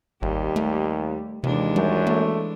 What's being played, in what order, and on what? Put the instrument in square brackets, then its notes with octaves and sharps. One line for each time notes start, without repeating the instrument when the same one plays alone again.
[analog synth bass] G#1 [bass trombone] D#2 [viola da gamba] G3
[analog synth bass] A3
[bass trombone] D#2 [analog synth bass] C3 [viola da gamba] E3 G#3 D4
[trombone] F#2 [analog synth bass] G3
[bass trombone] A3 [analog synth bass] A#3